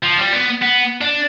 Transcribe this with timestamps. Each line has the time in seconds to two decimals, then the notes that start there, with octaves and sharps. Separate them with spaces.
0.03 F3
0.18 G3
0.32 B3
0.62 B3
1.01 D4